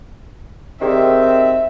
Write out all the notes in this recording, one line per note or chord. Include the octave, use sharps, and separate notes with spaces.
D#3 C4 G4 G#4 D5 E5